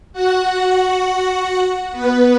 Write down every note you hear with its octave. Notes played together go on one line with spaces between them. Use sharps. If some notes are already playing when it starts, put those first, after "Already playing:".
F#4 F#5
F#4 F#5
B3 B4